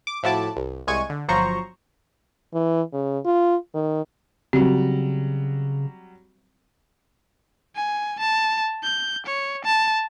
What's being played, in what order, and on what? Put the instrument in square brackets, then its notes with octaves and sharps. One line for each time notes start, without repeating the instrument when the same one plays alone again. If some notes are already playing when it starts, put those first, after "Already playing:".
[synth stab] D6
A2 F3 E4 F#4 A5 D6
C2
C2 G#3 G#5 C#6 G#6 D#7
D3
G1 F3 F#3 C5 A#5 C#6
[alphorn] E3
C#3
F4
D#3
[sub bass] C#3 [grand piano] F#3 G3 [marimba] C4
[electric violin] G#5
A5
G6
C#5
A5